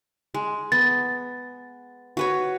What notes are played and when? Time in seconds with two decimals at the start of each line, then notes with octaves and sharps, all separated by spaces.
0.34 G#3
0.72 B3 A6
2.17 F#4 B4 C#5